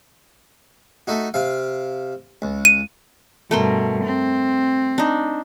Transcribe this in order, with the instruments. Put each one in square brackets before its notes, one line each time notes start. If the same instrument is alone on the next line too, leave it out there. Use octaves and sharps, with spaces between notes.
[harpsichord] A3 D#4 F#4
C3 F5
C#2
[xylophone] D#7
[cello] G2 B2 [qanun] A3 A#4 C6
[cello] C4
[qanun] D4 D#4